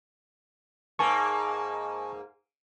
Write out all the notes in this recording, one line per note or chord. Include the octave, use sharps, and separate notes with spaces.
G#2 A#3 G#5 A5 C#6